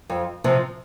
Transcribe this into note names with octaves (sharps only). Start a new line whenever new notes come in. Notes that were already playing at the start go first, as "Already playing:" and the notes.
F2
C3 F3 C4